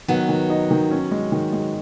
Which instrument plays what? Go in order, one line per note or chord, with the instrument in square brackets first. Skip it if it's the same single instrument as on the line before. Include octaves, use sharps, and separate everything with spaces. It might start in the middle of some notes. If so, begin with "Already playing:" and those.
[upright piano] D#3 [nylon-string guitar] F#3 B3
[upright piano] D#3
D#4
D#3
C#4
G#3
D#3
G#3